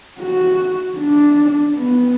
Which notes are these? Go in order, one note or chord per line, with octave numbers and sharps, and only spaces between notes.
F#4
D4
B3